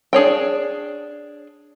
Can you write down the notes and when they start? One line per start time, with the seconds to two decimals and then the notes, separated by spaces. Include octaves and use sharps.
0.13 D4 G#4 C#5 G5